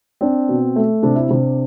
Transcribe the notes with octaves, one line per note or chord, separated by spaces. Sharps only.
C4 D4
B2
A3
C3 D4
E4
C3 D4